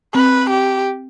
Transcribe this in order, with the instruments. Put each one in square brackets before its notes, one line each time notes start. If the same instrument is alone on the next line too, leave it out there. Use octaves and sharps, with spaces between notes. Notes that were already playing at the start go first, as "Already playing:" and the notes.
[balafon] C4 [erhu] B4
[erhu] G4